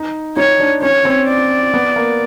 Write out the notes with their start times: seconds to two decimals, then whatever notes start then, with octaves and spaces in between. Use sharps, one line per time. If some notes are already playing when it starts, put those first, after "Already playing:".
Already playing: D#4
0.37 D#4 C#5
0.60 D4
0.82 C#4 C#5
1.05 C4
1.27 D5
1.74 B3
1.96 A#3